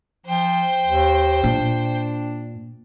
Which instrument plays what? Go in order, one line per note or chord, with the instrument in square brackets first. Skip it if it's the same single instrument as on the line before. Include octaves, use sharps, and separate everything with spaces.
[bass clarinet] F3 [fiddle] C5 G5
[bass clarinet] D#2
[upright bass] A#2 [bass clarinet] D4